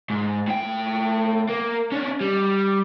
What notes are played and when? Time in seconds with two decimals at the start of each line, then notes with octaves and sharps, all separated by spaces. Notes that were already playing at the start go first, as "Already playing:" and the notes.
0.10 G#2
0.48 A2 G5
1.49 A#3
1.92 C#4 D4
2.21 G3